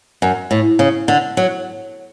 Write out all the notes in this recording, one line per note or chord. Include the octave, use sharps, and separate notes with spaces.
F#2
A2
C#3
D3
F#3